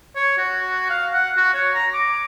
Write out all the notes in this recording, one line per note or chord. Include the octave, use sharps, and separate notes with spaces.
C#5
F#4
F5
F#5
F#4
C#5
A#5
D6